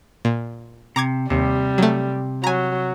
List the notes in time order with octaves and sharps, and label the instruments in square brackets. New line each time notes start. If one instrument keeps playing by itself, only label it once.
[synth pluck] A#2
[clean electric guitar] C3 [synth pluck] A#5 D6 G#6
[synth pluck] D#2 [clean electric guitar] C3 [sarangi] G3
[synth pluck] F#3 A3
[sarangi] F#3 [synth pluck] G#5 A#5